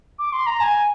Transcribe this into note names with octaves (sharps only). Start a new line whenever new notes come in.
D6
C6
A#5
G#5